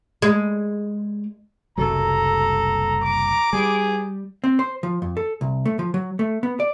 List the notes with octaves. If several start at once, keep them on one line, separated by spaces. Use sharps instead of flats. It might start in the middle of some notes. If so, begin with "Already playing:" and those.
G#3
F#1 C2 F#3 A4 A#5
D6
G3 G#4
C4
C5
F3
F2
A4
C2
A3
F3
F#3
A3
B3
D5